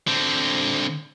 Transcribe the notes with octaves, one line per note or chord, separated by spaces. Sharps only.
D3 C4